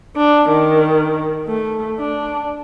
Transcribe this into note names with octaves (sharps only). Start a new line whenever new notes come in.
D4
D#3
A3
D4